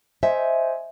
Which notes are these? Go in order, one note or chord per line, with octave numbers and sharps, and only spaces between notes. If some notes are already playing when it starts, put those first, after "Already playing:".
C5 D#5 E5 G#5